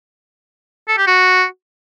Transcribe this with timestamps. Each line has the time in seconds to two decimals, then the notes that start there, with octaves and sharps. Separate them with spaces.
0.88 A4
0.98 G4
1.07 F#4